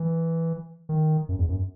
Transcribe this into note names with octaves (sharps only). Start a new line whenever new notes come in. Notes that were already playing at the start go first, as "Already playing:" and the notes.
Already playing: E3
D#3
F#2
E2
F#2